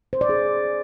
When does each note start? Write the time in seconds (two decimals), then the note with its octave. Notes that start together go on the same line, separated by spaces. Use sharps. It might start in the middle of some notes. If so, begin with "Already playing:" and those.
0.13 C5
0.21 D5
0.29 G#4